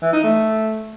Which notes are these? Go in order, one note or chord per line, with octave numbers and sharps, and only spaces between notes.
E3
D#4
A3